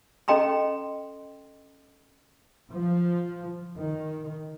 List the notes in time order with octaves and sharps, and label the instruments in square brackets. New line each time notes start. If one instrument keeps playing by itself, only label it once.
[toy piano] C#4 A4 D#5 G5 A#5 C6
[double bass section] F3
D#3